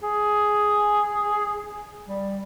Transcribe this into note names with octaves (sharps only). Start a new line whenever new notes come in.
G#4
G3